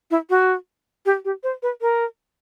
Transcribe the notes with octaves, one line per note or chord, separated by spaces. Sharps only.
E4
F#4
G4
G4
C5
B4
A#4